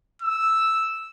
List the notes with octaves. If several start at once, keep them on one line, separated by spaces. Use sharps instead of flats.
E6